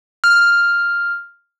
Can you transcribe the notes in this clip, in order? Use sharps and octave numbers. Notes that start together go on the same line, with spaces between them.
F6